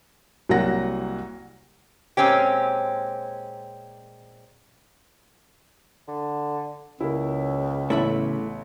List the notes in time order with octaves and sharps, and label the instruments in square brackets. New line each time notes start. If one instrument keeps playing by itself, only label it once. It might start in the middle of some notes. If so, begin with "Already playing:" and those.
[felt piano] C2 F#3 A#3 F#5 A#6
[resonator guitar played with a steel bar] A#2 G#3 C4 C#4 G4
[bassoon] D3
[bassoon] C#2 [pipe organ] C#3 [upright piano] A#3 E4
[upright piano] A1 B3 [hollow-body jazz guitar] A3 E4 E5